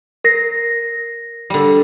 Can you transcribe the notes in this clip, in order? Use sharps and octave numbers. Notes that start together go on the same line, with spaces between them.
A#4 A#6 C7
D3 G3